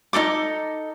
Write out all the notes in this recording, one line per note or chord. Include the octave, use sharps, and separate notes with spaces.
D#4 F4 A4 D6